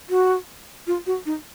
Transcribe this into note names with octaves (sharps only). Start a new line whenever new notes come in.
F#4
F4
F#4
D#4